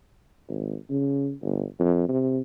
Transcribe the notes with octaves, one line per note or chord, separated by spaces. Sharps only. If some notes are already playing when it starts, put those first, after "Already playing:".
G#1
C#3
G1
F2
C3